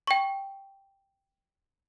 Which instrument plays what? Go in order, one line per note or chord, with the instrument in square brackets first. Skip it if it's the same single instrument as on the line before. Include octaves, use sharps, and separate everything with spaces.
[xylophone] G5 C#6